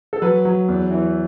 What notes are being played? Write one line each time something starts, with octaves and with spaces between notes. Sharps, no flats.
A4
F#3 B4
F#3
E2
E3